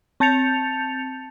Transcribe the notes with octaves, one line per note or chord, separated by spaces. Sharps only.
C4 A5 G6 A6 C#7 F7